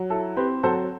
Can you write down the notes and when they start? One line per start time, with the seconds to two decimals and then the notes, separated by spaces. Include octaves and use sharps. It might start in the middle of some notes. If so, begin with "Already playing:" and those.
Already playing: F#3
0.10 E4 A4
0.37 C4 G4 B4
0.63 F#3 A4 C5